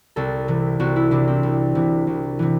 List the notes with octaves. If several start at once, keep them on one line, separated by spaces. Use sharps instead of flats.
C2 A4
C3 E3
C2 F#4
E4
C3 E3 D4
C4
C2
C3 E3
C2
C3 E3